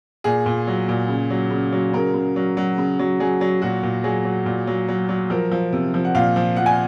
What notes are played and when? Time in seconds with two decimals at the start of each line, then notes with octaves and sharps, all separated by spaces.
0.24 A#2 G#4
0.46 A#2
0.67 F#3
0.89 A#2
1.09 C#3
1.30 F#3
1.51 C#3
1.72 F#3
1.93 C#3 A#4
2.14 C#3
2.36 F#3
2.57 F#3
2.78 C#3
2.99 F#3
3.20 F#3 G#4
3.41 F#3
3.62 A#2 F#4
3.83 A#2
4.04 F#3 G#4
4.25 F#3
4.46 A#2
4.67 F#3
4.89 F#3
5.09 F#3
5.30 F3 A#4
5.52 F3
5.73 C3
5.94 F3
6.05 F#5
6.15 A#2 F5
6.36 F3
6.56 F3 F#5
6.66 G#5